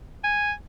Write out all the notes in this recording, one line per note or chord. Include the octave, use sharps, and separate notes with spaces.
G#5